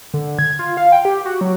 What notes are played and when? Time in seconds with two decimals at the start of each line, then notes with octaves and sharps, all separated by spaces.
0.14 D3
0.39 G#6
0.59 F4
0.77 F5
0.92 G5
1.05 G4
1.25 F#4
1.41 F#3